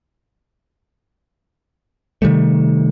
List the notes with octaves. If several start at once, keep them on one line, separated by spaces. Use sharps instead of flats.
C3 D#3 G3 A3